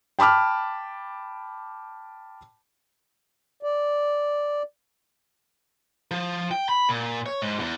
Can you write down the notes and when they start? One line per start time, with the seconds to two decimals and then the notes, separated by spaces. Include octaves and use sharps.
0.19 G5 A5 B5 D6 F6
3.63 D5
6.11 F3
6.51 G5
6.69 B5
6.89 A#2
7.26 C#5
7.42 G#2
7.59 E2